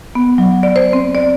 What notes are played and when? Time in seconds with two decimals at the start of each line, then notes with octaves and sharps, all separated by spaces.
0.15 B3
0.38 F#3
0.63 D5
0.76 C5
0.93 C4
1.15 D5